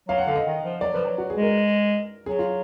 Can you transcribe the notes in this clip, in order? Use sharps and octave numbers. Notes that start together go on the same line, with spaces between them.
F#3 F5
F#5
D3 F5
D#5
D#3
F3
F#3 D5
F3 B4
F#3
F#3 F#4
G#4
G#3
A#4
F#3 G#4
F4